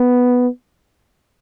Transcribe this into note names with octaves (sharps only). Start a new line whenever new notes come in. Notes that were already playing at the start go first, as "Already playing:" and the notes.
Already playing: B3